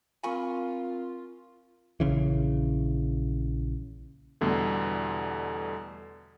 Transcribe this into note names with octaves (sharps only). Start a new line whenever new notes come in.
C4 F4 A#4 F5 G#5 B5 C#6
A#1 C#3 E3
E2 B2 D3 G3 A3